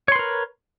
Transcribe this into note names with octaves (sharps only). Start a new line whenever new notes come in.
A#4 B4 C#5 C6